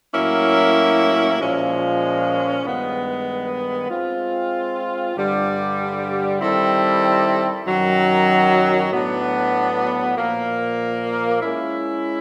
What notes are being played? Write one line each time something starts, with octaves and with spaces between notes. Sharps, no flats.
A2 F#3 A#3 C#4 E4
A#2 F3 G#3 C#4
G2 D#3 G#3 B3
G#3 C4 F4
G2 D3 G3
D#3 G3 C4 E4 A4
F#2 D#3 F#3
A2 F#3 B3 D4
A#2 F3 A#3
G#3 C#4 E4